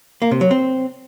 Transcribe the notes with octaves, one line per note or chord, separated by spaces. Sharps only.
A#3
C3
F#3
C4